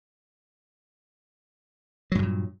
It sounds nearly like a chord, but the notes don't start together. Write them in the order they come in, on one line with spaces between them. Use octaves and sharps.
F#3 G2 C#3 A#2